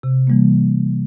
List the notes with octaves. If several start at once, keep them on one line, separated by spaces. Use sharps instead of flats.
C3
E3 G3 A#3